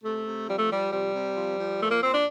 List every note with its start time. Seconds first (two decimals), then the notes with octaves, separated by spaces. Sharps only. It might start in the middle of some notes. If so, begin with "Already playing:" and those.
0.02 C3 A3
0.25 C3
0.47 F3 G3
0.59 A3
0.70 F3 G3
0.92 C3 G3
1.13 C3
1.36 F3
1.58 F3
1.80 A#2 A3
1.91 A#3
2.02 A#2 C4
2.13 D4